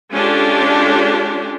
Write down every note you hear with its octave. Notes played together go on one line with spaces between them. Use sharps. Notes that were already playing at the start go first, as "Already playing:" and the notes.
G#3 C#4 D4 F4 G4 A4